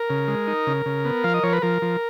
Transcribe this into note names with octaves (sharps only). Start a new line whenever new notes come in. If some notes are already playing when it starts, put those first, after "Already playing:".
Already playing: A#4
C#3
G#3
D#4
C#3
C#3
B3
F3 F5
D#5
F3 C#5
B4
F3 A#4
F3